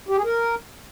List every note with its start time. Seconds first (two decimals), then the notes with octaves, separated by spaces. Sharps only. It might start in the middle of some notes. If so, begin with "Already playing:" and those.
0.09 G4
0.16 G#4
0.24 A#4